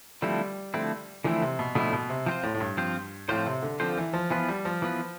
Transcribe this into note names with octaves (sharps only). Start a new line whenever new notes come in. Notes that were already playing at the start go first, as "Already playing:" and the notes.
D3 F3 G3 A3 C4 E4
D3 F3 A3 C4 E4
D3 E3 F3 A3 C4 E4
C3
B2
B2 D3 F3 A3 C4 E4
B2
C3
F3 C4 F4 C5
A2
A2
G2
F3 C4 F4 C5
A2 F3 C4 F4 C5
C3
D3
D3 F3 C4 F4 C5
E3
F3
E3 F3 B3 F4 B4
G3
F3
E3 B3 F4 B4